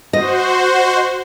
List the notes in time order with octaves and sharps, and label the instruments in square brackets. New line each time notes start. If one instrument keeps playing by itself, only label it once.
[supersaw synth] F#4 C5 [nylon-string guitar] D#5